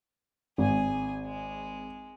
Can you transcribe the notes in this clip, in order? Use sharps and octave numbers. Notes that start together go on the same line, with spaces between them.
G#1 G#4 G#5
G#3